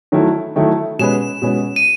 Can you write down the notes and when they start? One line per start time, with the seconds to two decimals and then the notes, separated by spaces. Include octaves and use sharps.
0.12 D#3 F#3 A3 E4 A4
0.56 D#3 F#3 A3 E4 A4
0.99 B2 G#3 C#4 G#4 B4 E7
1.42 B2 G#3 C#4 G#4 B4
1.76 D#7